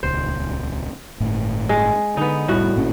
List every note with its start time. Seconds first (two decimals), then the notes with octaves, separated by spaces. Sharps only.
0.03 D#1 C#2 C5
1.20 G1 A2
1.69 G#3
2.17 D3 B3 D#4
2.48 F1 A2 G3 F#4
2.76 G#1 A#2 C#4